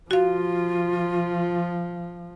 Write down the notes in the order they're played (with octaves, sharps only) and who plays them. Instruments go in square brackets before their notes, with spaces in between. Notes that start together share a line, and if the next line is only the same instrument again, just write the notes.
[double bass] F3 [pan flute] F4 [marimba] F#4 F5